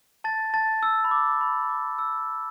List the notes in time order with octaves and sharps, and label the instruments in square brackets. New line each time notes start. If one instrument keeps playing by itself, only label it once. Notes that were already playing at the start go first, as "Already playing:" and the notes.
[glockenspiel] A5 A6
A5 A6
E6
B5
D6
B5
D6
E6